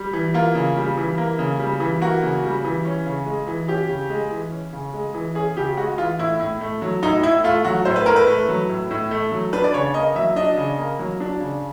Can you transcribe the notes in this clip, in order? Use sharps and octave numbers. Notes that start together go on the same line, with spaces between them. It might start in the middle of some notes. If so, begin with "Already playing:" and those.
Already playing: G3
E3
A#3 F4
C#3
G3
E3
A#3
C#3
G3
E3
A#3 F#4
C#3
G3
E3
C#4
C#3
G#3
E3
C#4 G4
C#3
G#3
E3
C#4
C#3
G#3
E3
C#4 G#4
C#3 G4
G#3 F#4
E3 F4
A2 E4
A2
A3
F#3
A2 D#4
A2 E4
A3 F4
F#3 F#4
A2 C5
B4
A2 A#4
B4
A3
F#3
A2
A2
A3
F#3
D4 B4
D5
C#3 C#5
A#3 D#5
F#3 E5
D4 D#5
C#3
A#3
F#3
D4
C#3